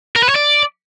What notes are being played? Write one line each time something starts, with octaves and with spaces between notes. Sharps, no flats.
A#4
B4
C#5
D5